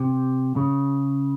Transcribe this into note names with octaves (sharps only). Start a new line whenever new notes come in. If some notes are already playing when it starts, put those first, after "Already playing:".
Already playing: C3
C#3